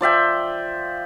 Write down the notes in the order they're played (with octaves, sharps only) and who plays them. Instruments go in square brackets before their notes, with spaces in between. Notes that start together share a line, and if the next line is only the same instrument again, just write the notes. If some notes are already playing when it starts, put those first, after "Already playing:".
[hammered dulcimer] F3 D5 E5 G5